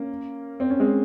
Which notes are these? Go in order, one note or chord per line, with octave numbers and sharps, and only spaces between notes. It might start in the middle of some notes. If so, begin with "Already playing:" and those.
Already playing: A#3 C#4
C4
C#4
G#3 C4